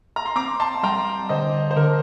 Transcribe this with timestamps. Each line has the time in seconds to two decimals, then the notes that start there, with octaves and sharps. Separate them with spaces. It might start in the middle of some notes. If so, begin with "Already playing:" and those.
0.16 A#5
0.26 C6
0.36 C4 A#5 D6
0.60 A5 C6
0.83 G3 G5 A#5
1.29 D3 C5 D#5
1.71 C5
1.76 D3 A#4